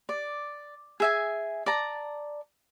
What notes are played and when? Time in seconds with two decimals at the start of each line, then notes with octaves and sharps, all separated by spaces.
0.09 D5
1.00 G#4 E5 G#5
1.66 D5 A5 A#5